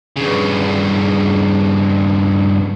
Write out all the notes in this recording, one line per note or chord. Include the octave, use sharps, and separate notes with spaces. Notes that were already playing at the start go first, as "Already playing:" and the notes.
G2 C#3